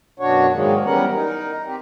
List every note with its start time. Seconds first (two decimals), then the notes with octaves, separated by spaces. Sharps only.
0.20 F#2 B2 D4 F#4 C#5
0.53 G#2 D#3 F#3 G#3 A#3
0.85 E3 G3 B3 C#4 A#4 F#5
1.14 D#4 A#4
1.66 C4 G4